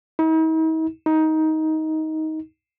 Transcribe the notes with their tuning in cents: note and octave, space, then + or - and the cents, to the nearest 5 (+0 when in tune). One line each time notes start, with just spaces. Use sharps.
D#4 +45
D#4 +15